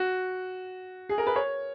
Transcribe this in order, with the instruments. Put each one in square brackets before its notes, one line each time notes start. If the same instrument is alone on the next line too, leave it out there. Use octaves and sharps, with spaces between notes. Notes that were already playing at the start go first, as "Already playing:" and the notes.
Already playing: [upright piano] F#4
G#4
A#4
B4
C#5